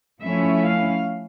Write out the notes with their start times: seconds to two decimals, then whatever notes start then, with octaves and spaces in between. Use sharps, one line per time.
0.22 F3 A3 C#4 E4 E5
0.63 F5